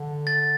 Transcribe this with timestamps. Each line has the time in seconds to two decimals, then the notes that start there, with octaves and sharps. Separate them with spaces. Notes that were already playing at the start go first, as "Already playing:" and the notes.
Already playing: D3
0.27 A6